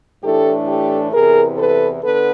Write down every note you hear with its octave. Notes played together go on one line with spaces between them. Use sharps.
A2 E3 A3 D4 G4 A4
G4 A4
E2 C3 E3 G#4 A#4
A4 B4
D3 B3 A4 B4